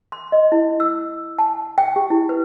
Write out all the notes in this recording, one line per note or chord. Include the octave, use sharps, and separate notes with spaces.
C6
D#5
E4
E6
A5
G5
G4
E4
B4